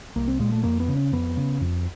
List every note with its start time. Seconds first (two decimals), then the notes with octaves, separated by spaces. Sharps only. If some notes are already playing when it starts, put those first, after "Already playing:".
0.16 C2 A#3
0.28 C4
0.40 A#2 G#3
0.52 A3
0.64 F2 A#3
0.80 B3
0.88 C#3
0.96 C#4
1.12 F2 B3
1.37 C#3
1.61 F2